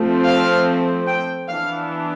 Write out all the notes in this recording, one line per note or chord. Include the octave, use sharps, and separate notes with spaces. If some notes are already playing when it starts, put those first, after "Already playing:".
Already playing: F3 A3 C4
F5
G5
E3 B3 D4 F5